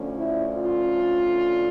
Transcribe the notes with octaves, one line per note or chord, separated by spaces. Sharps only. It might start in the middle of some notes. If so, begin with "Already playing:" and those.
Already playing: D2 D3 F3 C#4
E4
F4